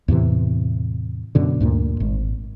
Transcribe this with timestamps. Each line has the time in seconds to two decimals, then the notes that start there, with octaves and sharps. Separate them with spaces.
0.08 E2 A2 C3 E3
1.35 F#2 B2 D3
1.60 D2 G2 A#2
2.00 G#1